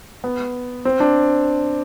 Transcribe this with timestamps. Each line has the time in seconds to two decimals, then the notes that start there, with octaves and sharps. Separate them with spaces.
0.24 B3
0.85 C4
1.00 D4